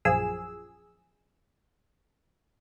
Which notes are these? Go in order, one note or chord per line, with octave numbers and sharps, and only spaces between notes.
A#1 F#2 F3 G#4 E6